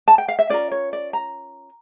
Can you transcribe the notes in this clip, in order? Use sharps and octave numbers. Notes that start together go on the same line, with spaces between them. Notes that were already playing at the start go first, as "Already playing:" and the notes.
A5
G5
F5
E5
C#4 F4 A#4 D5
C#5
D5
A#5